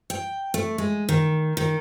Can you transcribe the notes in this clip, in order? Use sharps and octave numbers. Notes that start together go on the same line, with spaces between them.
G5
A3
G#3
D#3
D#3